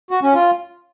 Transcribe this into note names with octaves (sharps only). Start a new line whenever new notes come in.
F#4
C#4
F4